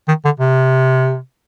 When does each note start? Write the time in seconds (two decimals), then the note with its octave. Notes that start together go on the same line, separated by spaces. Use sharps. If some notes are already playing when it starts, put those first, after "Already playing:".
0.08 D#3
0.25 D3
0.40 C3